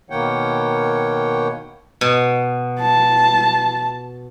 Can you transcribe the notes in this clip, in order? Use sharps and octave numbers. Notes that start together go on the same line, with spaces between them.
B2 D#3 A#3 C#5 F#5 G5
B2
A5